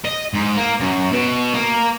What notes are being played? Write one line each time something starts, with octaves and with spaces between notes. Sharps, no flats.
D#5
G#2
A#3
F#2
B2
A#3